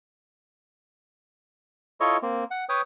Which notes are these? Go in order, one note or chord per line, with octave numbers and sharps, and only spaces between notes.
E4 F4 A4 C#5 D#5 C#6
A#3 C4
F#5
B4 C#5 G5 D#6